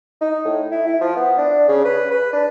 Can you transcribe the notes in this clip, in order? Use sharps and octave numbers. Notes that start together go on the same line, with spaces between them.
D#4
A2
E4
E4
F3
B3
D4
C#3
B4
B4
D4